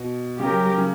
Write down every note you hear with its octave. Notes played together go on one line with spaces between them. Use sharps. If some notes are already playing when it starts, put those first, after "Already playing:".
Already playing: B2
C#3 F#3 C#4 G4 A#4
C#3